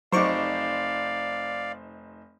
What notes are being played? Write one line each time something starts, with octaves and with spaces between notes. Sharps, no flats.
F1 F#3 D#4 C5 D5 F5 C#6 D6